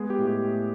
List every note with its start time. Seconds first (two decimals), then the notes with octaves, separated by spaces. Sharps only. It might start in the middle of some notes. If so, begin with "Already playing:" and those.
Already playing: G#3 B3 G#4
0.10 G4
0.19 A2
0.27 G4
0.44 A2